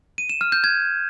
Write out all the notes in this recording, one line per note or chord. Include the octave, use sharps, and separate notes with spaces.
D#7
E7
F6
G6
G#6